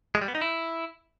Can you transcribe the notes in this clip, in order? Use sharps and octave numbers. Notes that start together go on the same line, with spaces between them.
G#3
G3
B3
D#4
E4